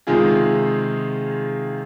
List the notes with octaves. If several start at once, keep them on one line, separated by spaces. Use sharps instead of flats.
C3 D#3 G#3 F4 G#4